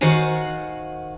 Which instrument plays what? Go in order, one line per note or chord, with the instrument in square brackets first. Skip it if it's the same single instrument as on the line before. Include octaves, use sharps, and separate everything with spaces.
[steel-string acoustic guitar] D#3 F#4 C5 F5 F#5 G#5